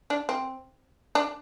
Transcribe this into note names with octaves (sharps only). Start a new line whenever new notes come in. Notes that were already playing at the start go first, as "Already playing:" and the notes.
D4
C4
D4